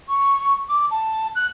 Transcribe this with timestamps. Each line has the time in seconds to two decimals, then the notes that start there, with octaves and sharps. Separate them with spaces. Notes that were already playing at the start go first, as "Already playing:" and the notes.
0.09 C#6
0.69 D6
0.91 A5
1.35 F#6